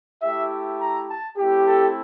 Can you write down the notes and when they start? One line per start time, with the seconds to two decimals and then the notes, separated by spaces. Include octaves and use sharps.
0.22 A3 E4 G4 E5
0.79 A#5
1.08 A5
1.37 A3 C4 E4 G4
1.66 A4